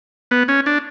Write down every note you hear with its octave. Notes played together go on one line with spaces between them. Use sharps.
B3
C#4
D4